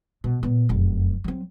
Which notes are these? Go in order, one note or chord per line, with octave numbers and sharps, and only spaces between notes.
B2
A#2 B3
F1 F#2
F#3 C4